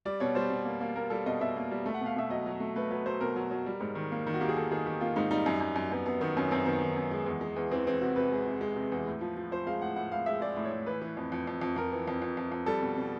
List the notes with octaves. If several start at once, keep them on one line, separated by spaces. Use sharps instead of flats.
G3 D5
B2 C#5
G3 C5
B2
A#3
A#3
A#3 A#4
G3 A4
B2 D#5
B2 E5
A#3
G3
A3
F#5
B2
F5
B2 E5
F#3 D#5
F#3
A3
A3 B4
F#3 B4
F#3 C5
B2 A#4
F#3
F#3
G3
G#2
D#3
A#3
D#3
F#4
A#3 G4
G#4
D#3 A4
D#3 G#4
D#3 G4
A#3 F4
G#2 D#4
G3 D#4
F#2
F#2
F#2
F#2 B3
F#2 B3
D#3 B3
F#2 C#4
F#2 C4
D#3 B3
D#3
F#2
G#3
E2
G#3
E2
E3 C4
E3 C4
C3 F#4
C3 B4
G#3
C3
G#3
C3
E2
A2
F3
F3
F3 C5
G#3 F5
A2 F#5
A2 F#5
A2 F5
G#3 E5
G#3 D5
A2
C#5
A2
E3 B4
E3
F2
F2
F2
F2
F2 A#4
E3
F2
F2
F2
F2
G3 A4
B2
B2